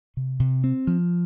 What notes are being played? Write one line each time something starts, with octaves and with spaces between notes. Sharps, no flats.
C3
C3
C4
F3